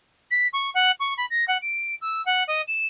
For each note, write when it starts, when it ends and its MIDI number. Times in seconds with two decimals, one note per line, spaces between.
0.31 0.47 95
0.53 0.70 85
0.74 0.91 78
1.00 1.14 85
1.17 1.25 83
1.30 1.45 94
1.48 1.57 78
1.62 1.95 98
2.01 2.24 88
2.25 2.43 78
2.47 2.62 75
2.67 2.87 100